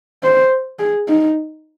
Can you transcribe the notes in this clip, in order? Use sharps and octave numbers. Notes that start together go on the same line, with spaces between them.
C5
G#4
D#4